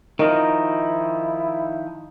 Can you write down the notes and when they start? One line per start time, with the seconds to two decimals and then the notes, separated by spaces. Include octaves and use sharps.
0.19 D#3 F3 D#4 E4 A#4 D#5